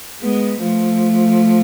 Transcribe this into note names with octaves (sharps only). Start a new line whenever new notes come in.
G#3 B3
F3 A3